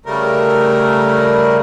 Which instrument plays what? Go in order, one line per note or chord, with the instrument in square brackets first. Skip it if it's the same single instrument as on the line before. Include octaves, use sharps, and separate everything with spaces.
[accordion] C#3 G3 A3 A#4